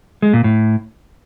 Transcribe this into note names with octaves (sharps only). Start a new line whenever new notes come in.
G#3
A#2
A2